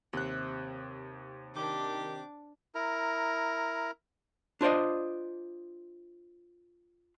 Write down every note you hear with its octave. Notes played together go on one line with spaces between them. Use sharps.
D#2 C3 F#6
D#3 D4 G4 D6
E4 A#4 A#5
D4 F4 C5 D5 D#5